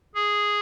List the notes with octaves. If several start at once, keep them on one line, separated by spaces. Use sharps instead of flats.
G#4